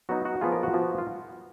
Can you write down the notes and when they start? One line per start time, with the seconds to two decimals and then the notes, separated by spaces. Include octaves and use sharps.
0.09 F#3 B3 D#4 F#4
0.25 F#4
0.41 F3 B3 F4 G#4
0.52 A#4
0.63 F#4
0.74 F3 B3 F4
0.98 F4